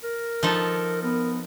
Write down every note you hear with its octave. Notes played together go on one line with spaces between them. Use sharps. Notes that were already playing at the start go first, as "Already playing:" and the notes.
A#4
F3 D#4 A4
B3 A#4